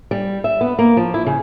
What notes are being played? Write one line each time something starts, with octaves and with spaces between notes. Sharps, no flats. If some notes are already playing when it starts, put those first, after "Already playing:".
G3
E5
B3
A#3
F3
E4
C#3